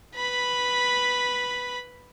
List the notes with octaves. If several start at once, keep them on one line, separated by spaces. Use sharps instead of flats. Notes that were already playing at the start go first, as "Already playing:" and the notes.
B4 B5